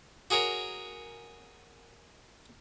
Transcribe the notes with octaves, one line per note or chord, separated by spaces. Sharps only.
F#4 G#4 A#4 C#5